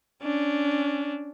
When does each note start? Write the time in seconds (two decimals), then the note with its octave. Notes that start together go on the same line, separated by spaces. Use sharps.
0.23 C#4 D4